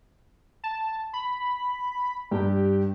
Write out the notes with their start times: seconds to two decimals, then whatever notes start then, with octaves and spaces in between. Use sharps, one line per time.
0.64 A5
1.13 B5
2.31 G2 G4